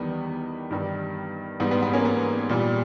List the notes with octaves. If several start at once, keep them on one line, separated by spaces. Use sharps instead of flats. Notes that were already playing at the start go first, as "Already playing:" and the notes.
Already playing: E2 D#3 G3 B3
G2 D#3 G3
G#2 G3 B3
B3
B3
A#3 C#4
B3
A#2 G3